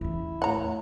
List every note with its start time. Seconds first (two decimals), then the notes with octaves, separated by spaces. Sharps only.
0.01 E2 C#4 E4
0.42 A2 C#5 F#5 A#5